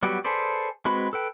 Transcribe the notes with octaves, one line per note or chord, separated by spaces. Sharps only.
F#3 G3 B3 F#4 G4
G#4 A4 B4 C5 D5
G#3 C4 F#4 B4 B5
A4 B4 G5